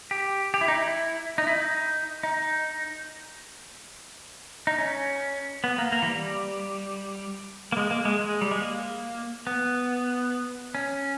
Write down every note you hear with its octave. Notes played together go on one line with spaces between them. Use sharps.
G4
G4
E4
D#4
E4
D#4
E4
D#4
D#4
D#4
C#4
B3
A#3
A#3
E3
G3
A#3
G#3
A#3
G#3
G#3
G3
G#3
A#3
B3
C#4